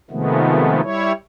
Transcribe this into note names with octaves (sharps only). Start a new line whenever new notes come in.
C3 D#3 F3 G#3 A3 B3
G3 E4 C#5